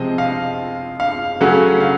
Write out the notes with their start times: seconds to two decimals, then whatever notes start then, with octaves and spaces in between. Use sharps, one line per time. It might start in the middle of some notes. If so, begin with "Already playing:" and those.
Already playing: C3 F3 G#3 C4 D#5
0.18 F5
1.00 F5
1.41 C#3 F#3 A3 C#4
1.80 F5